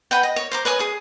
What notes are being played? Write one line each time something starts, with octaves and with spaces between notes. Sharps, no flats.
B4 F#5 G5
D#5
C#5
C5 A#5 D6
B4 C#5 G#5 D#6
G#4 D#6